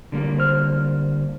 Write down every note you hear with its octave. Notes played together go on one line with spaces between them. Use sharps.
D3 G3 A#3
C5 F6